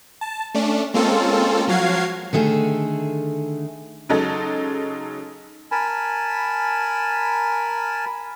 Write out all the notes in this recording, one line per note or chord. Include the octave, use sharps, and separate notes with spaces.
A5
A3 C#4 D4
G#3 A#3 C4 C#4 F4 A4
F3 F#3 F#4 F5 G#6 C7
D3 D#3 A3 G#4
C#3 F#3 G#3 D#4 A4
A#4 G#5 A5 B5